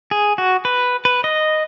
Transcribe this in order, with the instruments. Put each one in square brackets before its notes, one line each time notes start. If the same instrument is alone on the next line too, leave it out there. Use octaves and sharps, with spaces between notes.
[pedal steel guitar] G#4
F#4
B4
B4
D#5